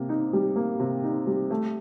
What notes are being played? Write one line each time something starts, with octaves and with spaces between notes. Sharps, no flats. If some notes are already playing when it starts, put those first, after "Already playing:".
Already playing: C3 A#3
D#4
G3
A#3
C3
D#4
G3
A3